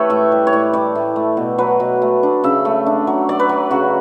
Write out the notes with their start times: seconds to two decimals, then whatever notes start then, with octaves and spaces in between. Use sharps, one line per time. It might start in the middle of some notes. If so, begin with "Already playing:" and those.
Already playing: E3 A3 E4 G4 A4 B4 C#5
0.10 A2 E5
0.32 G3
0.47 C#5
0.53 A2 D5
0.74 G3 D5
0.95 A2
1.16 A3
1.37 B2
1.58 F#3 B4
1.80 B2
2.02 A3
2.23 D4
2.44 C#3 E5
2.65 A3
2.86 D4
3.07 F#3
3.29 F#3 D5
3.39 B4
3.49 F#3
3.71 C#3 F#4